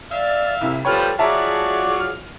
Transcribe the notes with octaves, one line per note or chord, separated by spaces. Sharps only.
D5 E5 F5
C2 C3 E4
F3 G3 A4 B4 C#5 G5 F6
F#3 F4 F#4 G#4 D5 E5 A5 A#5
F6